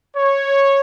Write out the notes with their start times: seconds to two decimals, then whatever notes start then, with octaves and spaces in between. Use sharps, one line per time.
0.16 C#5